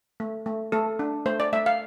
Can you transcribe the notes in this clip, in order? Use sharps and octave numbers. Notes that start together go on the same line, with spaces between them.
A3
A3
A3 A4
D4
A3 C5
D5
A3 E5
F5